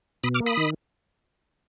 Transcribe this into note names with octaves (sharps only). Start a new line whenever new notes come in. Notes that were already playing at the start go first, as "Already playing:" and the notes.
B2 B5 D#6
D6 F6
A#3
B5 D#6
D#3